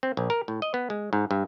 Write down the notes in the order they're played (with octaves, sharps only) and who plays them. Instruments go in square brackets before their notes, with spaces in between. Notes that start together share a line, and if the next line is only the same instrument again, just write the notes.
[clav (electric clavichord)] C4
A#1
A#4
A2
D#5
B3
G#3
G#2
G2